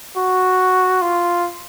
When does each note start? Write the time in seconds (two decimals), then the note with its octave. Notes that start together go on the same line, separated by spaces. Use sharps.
0.17 F#4
1.02 F4